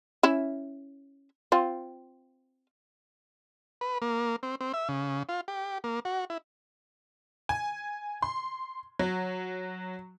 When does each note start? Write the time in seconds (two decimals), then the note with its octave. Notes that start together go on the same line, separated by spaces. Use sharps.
0.23 C#4 E4 E5
1.52 C4 F4
3.81 B4
4.02 A#3
4.43 C4
4.61 C4
4.74 E5
4.89 C#3
5.29 F4
5.48 G4
5.84 A#3
6.05 F#4
6.30 E4
7.49 G#5
8.22 C6
8.99 F#3